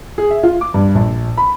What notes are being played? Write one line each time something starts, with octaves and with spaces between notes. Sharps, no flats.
G#4
E5
F4
D6
G2
A#1
B5